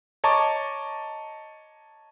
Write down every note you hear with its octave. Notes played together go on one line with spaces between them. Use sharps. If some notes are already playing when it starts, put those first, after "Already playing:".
C#5 D#5 A5 A#5 C#6 D6